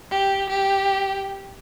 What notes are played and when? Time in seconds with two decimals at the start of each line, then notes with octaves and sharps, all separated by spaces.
0.11 G4
0.49 G4